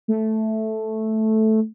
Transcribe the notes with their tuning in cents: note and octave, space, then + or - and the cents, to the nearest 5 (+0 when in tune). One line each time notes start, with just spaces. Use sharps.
A3 -5